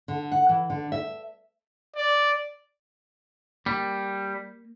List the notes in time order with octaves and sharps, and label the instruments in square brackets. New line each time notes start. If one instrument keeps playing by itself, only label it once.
[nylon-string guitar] D3
F#5
E3
D3
E5
[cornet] D5
[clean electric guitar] G3 [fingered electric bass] A#3